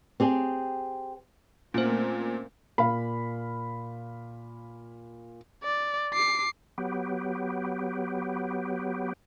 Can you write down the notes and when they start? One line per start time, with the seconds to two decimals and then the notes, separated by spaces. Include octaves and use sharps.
0.20 C4 G4 G#4
1.74 A#2 A3 A#3 C4 C#4 C5
2.78 A#2 F5 B5
5.64 D5
6.14 D6 C7
6.78 F#3 B3 G4